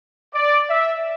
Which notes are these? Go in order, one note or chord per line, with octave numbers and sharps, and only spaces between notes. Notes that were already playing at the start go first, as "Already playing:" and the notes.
D5
E5